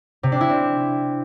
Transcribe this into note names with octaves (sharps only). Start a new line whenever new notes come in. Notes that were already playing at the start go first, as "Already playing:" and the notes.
C3
D4
E4
C4